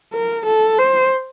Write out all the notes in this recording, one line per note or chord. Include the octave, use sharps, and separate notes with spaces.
A#4
A4
C5